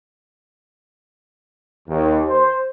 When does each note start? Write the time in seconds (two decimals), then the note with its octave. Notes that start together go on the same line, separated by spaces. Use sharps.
1.89 D#2
2.28 C5